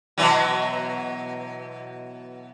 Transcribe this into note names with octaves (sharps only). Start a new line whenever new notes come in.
B2 E3 F#3